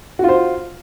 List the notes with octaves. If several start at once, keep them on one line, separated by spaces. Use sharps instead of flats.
F4 F#4 C5